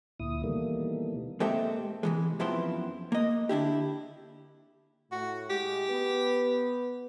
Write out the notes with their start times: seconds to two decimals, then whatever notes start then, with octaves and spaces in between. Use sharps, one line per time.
0.20 D2 A#2 E4 D#6
0.44 B2 D#3 E3 G3 A3 A#3
1.40 G#3 A#3 C4 G4 A4 E5
2.03 C3 E3 G#3
2.40 F#2 F3 B3 C4 E4 C6
3.12 A#3 D#5
3.49 D3 D4 E4 G4
5.12 A2 F#4
5.50 A2 G#3 G4
5.89 B3 B4